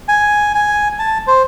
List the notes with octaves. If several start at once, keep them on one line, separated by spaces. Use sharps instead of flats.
G#5
G#5
A5
C5